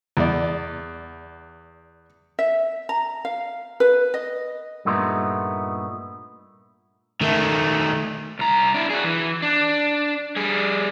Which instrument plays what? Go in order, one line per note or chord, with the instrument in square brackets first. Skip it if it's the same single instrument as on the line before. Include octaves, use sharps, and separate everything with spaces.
[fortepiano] E2 D5
[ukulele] E5
A#5
F5
B4
D#5
[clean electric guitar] G2 A#2 A3 B3 D#4 C6
[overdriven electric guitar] D#3 A3
C2 A#5
D4 E4
F#4 G#4
E3
D4
G3 G#4